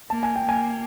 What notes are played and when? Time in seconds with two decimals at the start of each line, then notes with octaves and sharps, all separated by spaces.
0.10 A#3 A5
0.23 G#5
0.36 G5
0.45 A#3 G#5